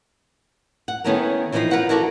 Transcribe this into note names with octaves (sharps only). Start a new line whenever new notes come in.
F#5
D#3 B3 C#4 E4 A4 A#4
E3 F3 A3 D4 D#4 F4
F4 A#4 B4 F#5
E4 F#4 A4 A#4 D5